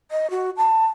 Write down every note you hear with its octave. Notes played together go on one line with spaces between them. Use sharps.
D#5
F#4
A5